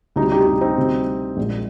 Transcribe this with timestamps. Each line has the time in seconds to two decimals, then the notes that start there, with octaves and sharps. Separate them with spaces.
0.16 D2 C3 G3 D#4 G4
0.32 D#4 G4
0.46 D#4 G4
0.61 C4 D#4
0.77 D2 C3 G3
1.37 A#1 A#2 G#3